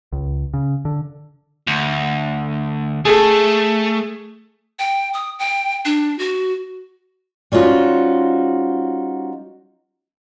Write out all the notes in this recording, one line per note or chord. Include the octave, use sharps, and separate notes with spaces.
C#2
C#3
D3
D2
A3 G#4 A4
G5
D#6
G5
D4
F#4
G3 C#4 D#4 F4 F#4 C5